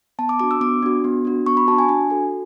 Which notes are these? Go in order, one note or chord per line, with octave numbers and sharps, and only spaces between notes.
B3 A5
D6
D4 F#4 D6
E6
B3 D6
D4 F#4
B3
D4 F#4
B3 C#6
B5
D4 F#4 A5
G#5
D4 G#5
F#4 A4